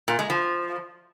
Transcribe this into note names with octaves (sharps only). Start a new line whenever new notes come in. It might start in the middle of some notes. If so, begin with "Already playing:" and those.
A#2
G#3
F3